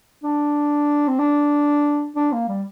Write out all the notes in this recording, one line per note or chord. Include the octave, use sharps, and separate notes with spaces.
D4
C4
D4
D4
A#3
G3